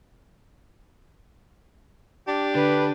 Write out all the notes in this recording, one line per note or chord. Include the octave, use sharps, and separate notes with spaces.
D4 G4
D3 B4